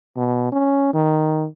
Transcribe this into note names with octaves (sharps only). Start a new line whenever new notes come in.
B2
C#4
D#3